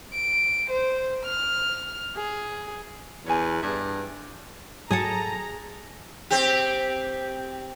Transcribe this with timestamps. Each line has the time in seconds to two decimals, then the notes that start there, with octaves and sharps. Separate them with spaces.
0.14 D7
0.69 C5
1.24 F6
2.16 G#4
3.26 E2 C#5 E5 G#5
3.62 G2 G#4 A4 E5
4.91 G#2 F#3 G#4 A4 A5 A#5 D#6
6.31 C4 G4